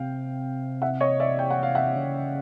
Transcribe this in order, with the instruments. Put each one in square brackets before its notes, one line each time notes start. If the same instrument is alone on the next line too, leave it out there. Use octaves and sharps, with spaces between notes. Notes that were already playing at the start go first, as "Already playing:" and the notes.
Already playing: [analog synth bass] C3 [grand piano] F5 G5
[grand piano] E5 F#5
C#5 D#5
D5 E5
G5
F#5
F5
E5 F#5
[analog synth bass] C#3